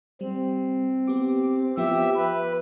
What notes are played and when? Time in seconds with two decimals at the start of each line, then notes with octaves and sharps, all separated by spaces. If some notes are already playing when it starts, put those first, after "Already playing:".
0.21 G3 C4
1.07 B3 G4 D6
1.77 F3 B3 F4 G4 E5
2.16 B4